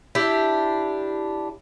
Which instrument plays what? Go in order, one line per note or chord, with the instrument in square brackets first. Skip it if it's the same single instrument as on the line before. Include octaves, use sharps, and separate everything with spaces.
[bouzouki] D4 E4 G4